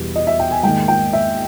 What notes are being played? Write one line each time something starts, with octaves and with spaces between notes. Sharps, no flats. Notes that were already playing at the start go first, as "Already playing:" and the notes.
Already playing: E2 B2 G3 B3
D#5
E5
G5
G#5
G#2 D#3 A#3 G5
G5
E5